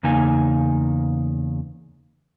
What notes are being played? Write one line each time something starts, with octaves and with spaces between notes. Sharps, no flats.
E2 C#3 A#3 D#4 G#5